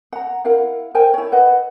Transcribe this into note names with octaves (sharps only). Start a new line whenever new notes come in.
F#5 A#5
E4 A#4 F5 F#5
A#4 C5 G5 G#5
E4 C#5
B4 D#5 F#5